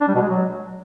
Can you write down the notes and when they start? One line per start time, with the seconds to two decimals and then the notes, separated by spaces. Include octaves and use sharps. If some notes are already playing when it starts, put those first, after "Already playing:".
0.01 D4
0.08 G3
0.15 B2
0.22 G#3
0.29 F#3